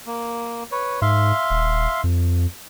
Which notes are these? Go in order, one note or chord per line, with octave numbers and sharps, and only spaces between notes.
A#3
B4 C#5
G#2 E5 F5 C6
D#1
F2